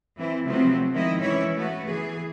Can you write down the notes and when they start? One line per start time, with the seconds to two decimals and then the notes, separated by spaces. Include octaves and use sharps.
0.16 E3 C4 E4
0.45 C3 F3 F#3 A3 B3 C4
0.91 D#3 F3 G#3 C4 E4 D#5
1.20 E3 C#4 E4 C#5
1.56 A3 B3 F#4
1.87 E3 G#4